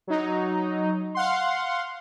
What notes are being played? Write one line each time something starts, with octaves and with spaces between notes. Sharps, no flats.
F#3 D#4
F5 F#5 C6